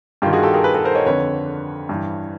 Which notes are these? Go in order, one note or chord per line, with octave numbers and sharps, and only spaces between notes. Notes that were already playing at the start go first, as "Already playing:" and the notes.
G2 D#3 F4 G4
F#4 G#4
G4 A4
G#4 A#4
A4 B4
A4 B4
A#4 C5
C#5 D#5
F2 D3 B4 C#5
G2 E3